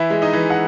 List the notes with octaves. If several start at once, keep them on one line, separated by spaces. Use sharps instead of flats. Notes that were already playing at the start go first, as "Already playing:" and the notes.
Already playing: E3 E4 E5
G#3
D#4 D#5
E3
F#5